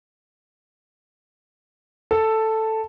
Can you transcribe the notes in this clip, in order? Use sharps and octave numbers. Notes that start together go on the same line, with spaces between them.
A4